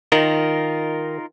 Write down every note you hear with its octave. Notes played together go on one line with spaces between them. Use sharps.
D#3 D#4 F4 A#4